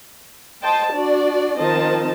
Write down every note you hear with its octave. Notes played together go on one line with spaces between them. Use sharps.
C5 D#5 G5 A5
D4 F#4 D5
D#3 F3 C4 D#5 A5